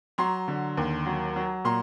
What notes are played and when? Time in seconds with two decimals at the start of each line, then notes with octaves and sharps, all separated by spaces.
0.18 F#3 A#5 C6
0.48 D3
0.77 D#2
1.06 F#3
1.36 F#3
1.65 A#2 A#5 C6